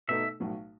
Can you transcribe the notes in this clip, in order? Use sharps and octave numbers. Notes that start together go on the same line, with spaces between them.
B2 A3 D#4 A4 E5
B1 A2 F#3